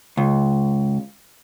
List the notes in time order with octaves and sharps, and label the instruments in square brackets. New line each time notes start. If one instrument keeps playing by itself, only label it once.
[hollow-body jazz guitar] C#2